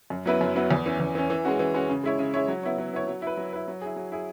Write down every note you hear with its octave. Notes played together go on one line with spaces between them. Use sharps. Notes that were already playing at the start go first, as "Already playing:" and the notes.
F#2
F#3 B3 E4 B4
F#2
F#3 B3 E4 B4
E2
E3 C#4
E2
E3 C#4
E3
G#3 C#4 F#4
E3
G#3 C#4 F#4
C#3
G#3 E4 C#5
C#3
G#3 E4 C#5
F#3
B3 E4 C#5
F#3
B3 E4 C#5
F#3
E4 B4
F#3
E4 B4
F#3
E4 G#4
F#3
E4 G#4